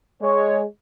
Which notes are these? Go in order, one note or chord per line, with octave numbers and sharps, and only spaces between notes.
G#3 C#5